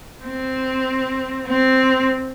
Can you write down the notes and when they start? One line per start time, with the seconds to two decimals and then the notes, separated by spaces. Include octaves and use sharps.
0.23 C4
1.47 C4